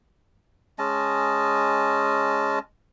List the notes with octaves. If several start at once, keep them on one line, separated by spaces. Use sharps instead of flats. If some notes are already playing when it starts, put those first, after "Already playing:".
G#3 C#4 D#5 A5